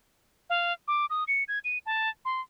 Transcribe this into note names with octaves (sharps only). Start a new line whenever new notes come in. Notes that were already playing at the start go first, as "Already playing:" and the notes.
F5
D6
D#6
C#7
G#6
D#7
A5
C6